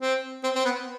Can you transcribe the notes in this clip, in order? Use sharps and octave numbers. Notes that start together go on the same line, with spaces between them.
C4
C4
C4
B3